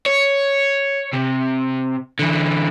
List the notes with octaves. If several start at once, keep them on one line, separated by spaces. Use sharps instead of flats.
C#5
C3
D3 E3